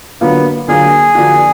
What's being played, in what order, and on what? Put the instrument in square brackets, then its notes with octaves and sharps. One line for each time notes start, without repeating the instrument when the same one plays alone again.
[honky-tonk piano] D3 F#3 A#3 F4 [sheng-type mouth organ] B3
[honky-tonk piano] D3 F#3 A#3 F4 [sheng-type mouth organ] G#4
[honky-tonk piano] D3 F3 A#3 D4 F#4